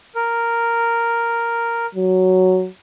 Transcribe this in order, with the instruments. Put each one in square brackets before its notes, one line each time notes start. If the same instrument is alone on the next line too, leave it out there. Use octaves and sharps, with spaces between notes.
[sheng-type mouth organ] A#4
[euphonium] F#3